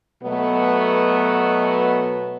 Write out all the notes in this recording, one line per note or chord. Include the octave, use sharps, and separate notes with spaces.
B2 F#3 A3 B3